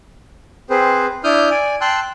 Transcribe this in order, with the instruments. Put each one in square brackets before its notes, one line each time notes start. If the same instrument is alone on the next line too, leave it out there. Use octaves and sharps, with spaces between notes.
[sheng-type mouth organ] C4 G#4 B4 C5
D4 E4 D#6 F6 G6
D5 G#5
G5 A5 C6 E6 F#6